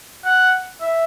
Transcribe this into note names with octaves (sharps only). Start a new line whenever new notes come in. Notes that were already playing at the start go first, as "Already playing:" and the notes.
F#5
E5